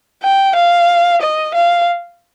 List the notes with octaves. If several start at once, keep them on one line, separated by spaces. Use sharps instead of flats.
G5
F5
D#5
F5